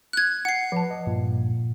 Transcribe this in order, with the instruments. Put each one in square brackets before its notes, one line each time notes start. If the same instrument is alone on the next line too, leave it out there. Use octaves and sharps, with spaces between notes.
[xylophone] F#6 G#6
F#5 C7
[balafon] F3 A5 [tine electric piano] B4
[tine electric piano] D#5
[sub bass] G2 [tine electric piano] A#2